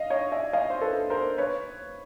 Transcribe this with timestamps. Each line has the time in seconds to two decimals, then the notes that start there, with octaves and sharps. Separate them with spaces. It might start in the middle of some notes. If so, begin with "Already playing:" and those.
Already playing: D#5 F5
0.10 C#5 D#5
0.32 D5 E5
0.53 D#5 F5
0.70 C5
0.81 A4 B4
1.10 A#4 C5
1.38 B4 C#5